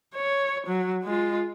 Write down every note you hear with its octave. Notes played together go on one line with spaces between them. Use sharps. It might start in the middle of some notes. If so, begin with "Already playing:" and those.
C#5
F#3
G#3 F4